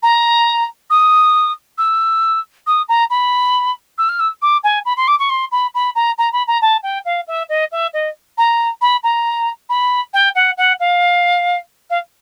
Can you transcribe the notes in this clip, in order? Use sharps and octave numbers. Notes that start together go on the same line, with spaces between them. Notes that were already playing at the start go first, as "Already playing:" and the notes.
A#5
D#6
E6
D#6
A#5
B5
E6
F6
E6
D6
G#5
B5
C6
D6
C#6
C6
B5
B5
A#5
A#5
B5
A#5
A5
G5
F5
E5
D#5
E5
D#5
A#5
B5
A#5
B5
G5
F#5
F#5
F5
F5